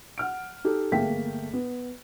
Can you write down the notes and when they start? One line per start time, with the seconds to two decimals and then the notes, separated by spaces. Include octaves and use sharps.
0.18 F#5 F6 D7
0.64 D#4 G4 A4
0.92 G1 A3 A#3 G#4 G5 B6
1.53 B3